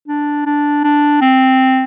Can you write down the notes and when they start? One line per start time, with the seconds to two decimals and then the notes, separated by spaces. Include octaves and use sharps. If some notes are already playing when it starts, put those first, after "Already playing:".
0.08 D4
0.46 D4
0.84 D4
1.21 C4